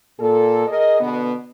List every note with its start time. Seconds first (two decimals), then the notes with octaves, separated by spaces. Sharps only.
0.19 A#2 A4
0.67 G#4 A#4 D#5
1.00 B2 D3 B3